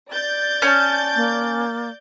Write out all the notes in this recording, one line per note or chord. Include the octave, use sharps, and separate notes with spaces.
D5 G6 A6
C#4 G#5 A5
A#3